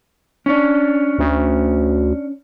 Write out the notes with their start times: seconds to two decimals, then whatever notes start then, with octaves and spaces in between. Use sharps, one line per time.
0.46 C#4 D4
1.19 D2